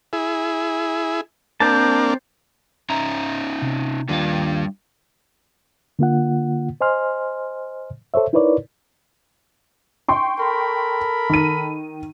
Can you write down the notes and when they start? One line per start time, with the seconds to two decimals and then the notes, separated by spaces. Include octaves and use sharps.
0.13 E4 G#4
1.60 A#3 C4 D4 C5 A5
2.90 C#4 D#4 E5 A#5
3.62 C3
4.09 D#2 G3 D4 F4 F5
5.99 D3 A#3 F4 F#5
6.81 C5 D#5 G#5 C6 F6
8.14 A4 C5 C#5 E5
8.33 D#4 E4 A#4 B4 C#5 D5
10.08 G5 C6 C#6
10.39 A4 A#4 B5
11.30 D#3 D#7